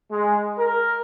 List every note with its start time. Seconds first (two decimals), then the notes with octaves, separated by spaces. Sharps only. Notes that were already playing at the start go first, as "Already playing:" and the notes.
0.11 G#3
0.58 A#4